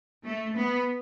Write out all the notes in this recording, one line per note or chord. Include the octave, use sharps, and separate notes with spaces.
A3
B3